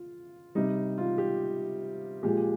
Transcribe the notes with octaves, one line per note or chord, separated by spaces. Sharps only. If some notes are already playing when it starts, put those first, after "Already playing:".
Already playing: F4
C3 G3 D#4
F4
G4
A#2 F3 G#3 G4